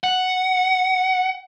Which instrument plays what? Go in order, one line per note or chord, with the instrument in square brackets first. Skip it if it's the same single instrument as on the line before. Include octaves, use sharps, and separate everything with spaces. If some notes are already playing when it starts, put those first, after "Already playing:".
[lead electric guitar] F#5